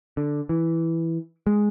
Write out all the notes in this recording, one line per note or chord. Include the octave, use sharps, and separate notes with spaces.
D3
E3
G#3